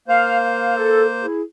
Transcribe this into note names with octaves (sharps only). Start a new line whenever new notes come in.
A#3 C5 F5
F5
A4
E4 G#4